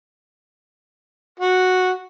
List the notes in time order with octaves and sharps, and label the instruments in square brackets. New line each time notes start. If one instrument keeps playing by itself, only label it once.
[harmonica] F#4